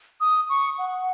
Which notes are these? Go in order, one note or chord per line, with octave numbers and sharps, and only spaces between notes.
D#6
C#6
F#5